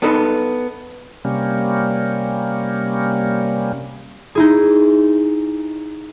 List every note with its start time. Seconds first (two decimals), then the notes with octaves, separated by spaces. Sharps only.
0.02 B3 D4 D#4 A4 B4
1.25 C3 G3 A#3 C#4
4.35 D#4 E4 G#4